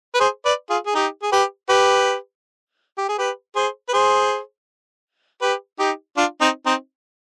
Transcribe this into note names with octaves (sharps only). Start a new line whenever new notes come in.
B4
G#4 C5
B4 D5
F4 G#4
G#4
D#4 G4
G#4
G4 B4
G4 B4
G4
G#4
G4 B4
G#4 C5
B4
G#4 C5
G4 B4
D#4 G4
D4 F4
C4 D#4
C4 D#4